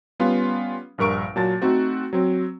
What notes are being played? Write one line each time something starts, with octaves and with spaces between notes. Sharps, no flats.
G3 B3 C#4 F4
A#1 G2 A#4 C#6 D7
A#2 F#3 A5 A6
A3 C4 D#4 F#4
F#3 C4